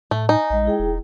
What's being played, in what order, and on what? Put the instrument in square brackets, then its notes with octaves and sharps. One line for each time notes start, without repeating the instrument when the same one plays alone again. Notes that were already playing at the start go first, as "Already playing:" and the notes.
[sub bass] A2 [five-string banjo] A3
[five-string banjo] D#4 [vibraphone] G#5
[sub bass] A#1 [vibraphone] G#3 D#5
[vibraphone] E4 G#4 G5
[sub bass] E1